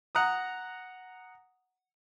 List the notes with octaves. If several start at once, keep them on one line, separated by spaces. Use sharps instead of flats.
F#5 A#5 D#6